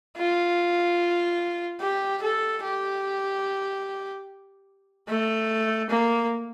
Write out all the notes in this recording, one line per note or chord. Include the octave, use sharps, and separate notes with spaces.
F4
G4
A4
G4
A3
A#3